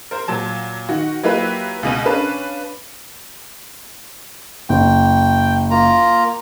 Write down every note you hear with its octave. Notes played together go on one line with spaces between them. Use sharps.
A#4 C5
A#2 F#3 A5
D#3 F#4
F#3 A#3 E4 F4 G4 B4
C#2 B2 D#7
C#4 D4 B4 F5 A5
F#1 G5
A#3 F4 A#5